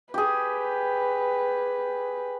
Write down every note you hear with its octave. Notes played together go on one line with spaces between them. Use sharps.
G4 G#4 B4